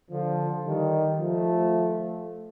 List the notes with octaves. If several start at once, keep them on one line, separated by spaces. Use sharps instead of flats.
D3 F3
D#3 G3
F3 A3